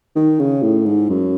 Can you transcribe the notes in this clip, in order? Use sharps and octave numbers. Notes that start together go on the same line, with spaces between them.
D#3
C#3
A2
G#2
F#2